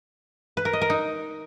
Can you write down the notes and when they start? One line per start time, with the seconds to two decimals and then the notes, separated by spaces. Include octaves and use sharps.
0.57 B4
0.65 A#4
0.73 D#5
0.81 A#4
0.90 D#4